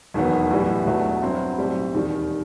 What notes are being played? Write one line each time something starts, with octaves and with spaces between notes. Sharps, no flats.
E1 D#2 D#3 F#3 B3
B1 A2 E3 G3 B3
E1 E2 B2 F#3 A3
G2 F#3 C4 E4
B1 A2 G3 C4
E1 D#2 D#3 G3